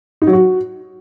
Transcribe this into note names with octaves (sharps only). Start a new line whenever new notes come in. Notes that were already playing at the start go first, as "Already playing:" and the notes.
D#4
F#3
F#4